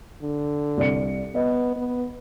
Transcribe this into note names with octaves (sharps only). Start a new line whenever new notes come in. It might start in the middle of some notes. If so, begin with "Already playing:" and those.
D3
C2 D5 C#7
B3 D#5
B3